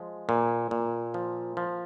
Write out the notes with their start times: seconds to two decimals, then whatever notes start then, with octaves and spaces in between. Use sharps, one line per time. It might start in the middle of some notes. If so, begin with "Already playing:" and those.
Already playing: F3 G#3
0.29 A#2
0.71 A#2
1.14 F3
1.57 F3